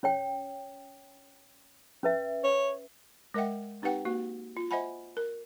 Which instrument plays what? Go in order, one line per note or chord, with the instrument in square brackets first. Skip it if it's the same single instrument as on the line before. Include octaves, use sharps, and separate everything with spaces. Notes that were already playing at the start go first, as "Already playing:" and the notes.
[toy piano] C#4 C#5 G5
C#4 B4 E5
[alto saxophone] C#5
[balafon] G#3 A#4 D#5 E5 F#5 G5
C4 D#4 G4 B4 F#5 G5
A#3 F#4
F4
C5 D#5 E5 F#5 G#5 B5
A#4